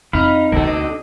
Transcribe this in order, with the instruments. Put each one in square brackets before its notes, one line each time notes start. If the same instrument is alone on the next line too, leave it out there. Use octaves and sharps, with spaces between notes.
[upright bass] F2 [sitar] D#4 [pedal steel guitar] F5 B5
[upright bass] D2 D3 [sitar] B2 C4 A4 [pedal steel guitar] A#3
[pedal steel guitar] D4 D#5